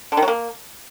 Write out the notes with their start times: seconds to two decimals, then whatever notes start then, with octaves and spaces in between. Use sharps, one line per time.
0.12 D3
0.17 D#3
0.22 F#3
0.28 A#3